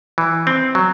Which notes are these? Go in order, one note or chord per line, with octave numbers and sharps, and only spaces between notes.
E3
C4
F#3